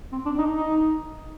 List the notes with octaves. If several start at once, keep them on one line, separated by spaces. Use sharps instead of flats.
C4
D4
D#4
D#4